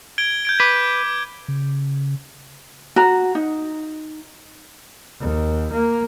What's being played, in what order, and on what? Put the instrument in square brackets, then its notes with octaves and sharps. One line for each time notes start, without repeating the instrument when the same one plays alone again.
[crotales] G#6 D7 G7
G6 G#6 D7
[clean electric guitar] B4 [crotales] D6
[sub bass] C#3
[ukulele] F#4 A#5
D#4
[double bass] D#2
A#3